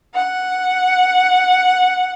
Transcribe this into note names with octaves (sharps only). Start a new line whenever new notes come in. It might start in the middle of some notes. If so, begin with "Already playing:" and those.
F#5